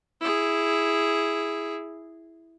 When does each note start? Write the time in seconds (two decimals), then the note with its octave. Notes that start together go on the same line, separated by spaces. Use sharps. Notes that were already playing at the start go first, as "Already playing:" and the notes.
0.21 E4 G#4